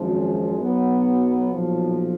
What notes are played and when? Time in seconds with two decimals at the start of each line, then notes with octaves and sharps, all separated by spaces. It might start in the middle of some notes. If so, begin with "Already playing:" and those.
Already playing: G#1 F#2 F3 G#3
0.57 B1 B2 F#3 B3
1.49 B1 A#2 F3